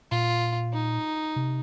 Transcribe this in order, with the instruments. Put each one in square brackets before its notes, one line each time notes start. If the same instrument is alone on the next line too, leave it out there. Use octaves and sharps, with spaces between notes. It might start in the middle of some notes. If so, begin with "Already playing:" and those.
[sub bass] A#2 [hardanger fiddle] F4
[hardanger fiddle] D#4
[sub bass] C3